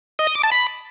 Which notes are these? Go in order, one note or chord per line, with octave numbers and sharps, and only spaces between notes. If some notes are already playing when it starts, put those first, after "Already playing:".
D#5
D#6
D6
A5
B5